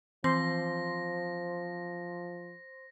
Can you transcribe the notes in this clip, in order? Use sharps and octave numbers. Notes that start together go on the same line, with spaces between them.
E3 F3 C4 C5 C6 A#6